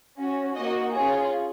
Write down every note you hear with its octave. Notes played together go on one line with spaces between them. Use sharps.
C#4 F#4
A#3 D#4 F#4 D#5
C#4 F4 G#4 C#5